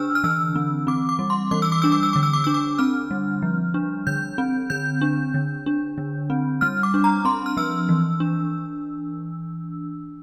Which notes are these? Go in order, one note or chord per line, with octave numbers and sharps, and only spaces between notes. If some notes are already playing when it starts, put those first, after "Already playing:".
Already playing: D3 D4 E6 F6
F6
E3 E6
C4
C4 D6
D6
G3
C6
E3 D6
E6
D6
D4 E6
D6
E6
D3 D6
E6
D6
D4 E6
D6
C4 F6
G3
F3
D4
D3 G6
C4
D3 G6
D4
D3
D4
D3
C4
G3 F6
D6
D4
A#5
C4 C6
F6
F3 E6
E3
D4